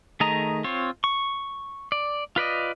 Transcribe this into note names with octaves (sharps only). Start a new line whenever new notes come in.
D#3 A3 G#4 D#5 A#5
C4 F4 C#5
C#6
D5
F4 B4 D5 D#5